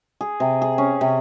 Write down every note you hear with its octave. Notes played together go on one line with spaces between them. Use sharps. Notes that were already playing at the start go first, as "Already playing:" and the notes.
G#4
C3
G#4
C#4
C3